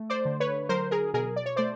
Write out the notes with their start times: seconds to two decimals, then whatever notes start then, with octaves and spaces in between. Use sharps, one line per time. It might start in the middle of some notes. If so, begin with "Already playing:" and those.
Already playing: A3
0.10 C5 D5
0.25 D3
0.40 B4 C#5
0.69 F#3 A#4 C5
0.91 G#4 A#4
1.14 B2 G#4 A#4
1.36 D5
1.46 C#5
1.56 A3 C5 D5